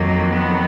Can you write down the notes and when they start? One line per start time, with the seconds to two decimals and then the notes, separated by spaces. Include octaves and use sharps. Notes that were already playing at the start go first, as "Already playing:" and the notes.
Already playing: F2 D#3 F#3 A#3
0.32 B3